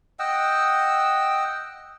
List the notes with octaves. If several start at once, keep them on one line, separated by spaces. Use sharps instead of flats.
D#5 F#5 G5 E6